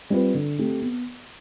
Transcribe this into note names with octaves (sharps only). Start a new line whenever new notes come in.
G3 C4 F4 B4
D3
A3 C4 G4
B3